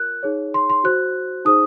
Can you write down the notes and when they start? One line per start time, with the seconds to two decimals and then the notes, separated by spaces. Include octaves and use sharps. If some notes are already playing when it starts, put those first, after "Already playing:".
Already playing: F4 A#4 F#6
0.23 D#4 G#4 C#5
0.54 C6
0.70 C6
0.84 F#4 C5 F#6
1.45 D#4 G#4 C5 D#6